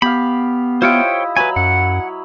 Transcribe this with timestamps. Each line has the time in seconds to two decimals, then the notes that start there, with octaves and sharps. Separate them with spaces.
0.02 B3 G4 F5 B5
0.82 E4 F4 C5 C#5 D#5 G5
1.37 F#3 B4 C#5 G#5 B5
1.56 F#2 F#5